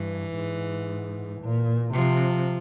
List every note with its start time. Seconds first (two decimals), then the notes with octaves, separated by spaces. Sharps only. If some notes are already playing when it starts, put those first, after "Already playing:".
Already playing: G2 E3
0.34 G#2
1.41 A#2
1.93 C3 F3